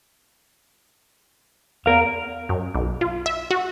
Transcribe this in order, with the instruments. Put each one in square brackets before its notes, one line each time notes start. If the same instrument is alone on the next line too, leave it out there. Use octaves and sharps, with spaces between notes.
[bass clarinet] E2 [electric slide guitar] A#4 F5
[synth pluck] F#2
B1
F4
E5
F#4